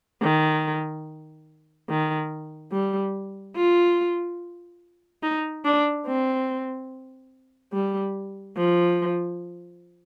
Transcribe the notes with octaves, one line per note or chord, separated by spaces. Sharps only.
D#3
D#3
G3
F4
D#4
D4
C4
G3
F3